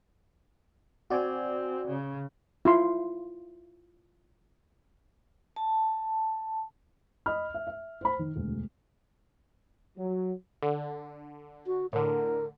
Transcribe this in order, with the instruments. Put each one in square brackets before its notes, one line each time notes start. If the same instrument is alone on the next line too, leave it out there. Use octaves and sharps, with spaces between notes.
[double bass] C4 [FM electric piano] F#4 D5 G#5
[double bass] C#3
[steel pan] E4 F4 C6
[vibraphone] A5
[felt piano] D#5 B5 F6
E5
E5
C5 B5
D#3
E1 D2
[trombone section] F#3
[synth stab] D3
[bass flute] F#4
[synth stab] A2 D3 [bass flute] A#4